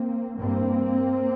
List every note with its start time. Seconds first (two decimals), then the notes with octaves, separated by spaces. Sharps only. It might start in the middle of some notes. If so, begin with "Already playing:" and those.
Already playing: A#3 C4
0.37 G2 A#3 C4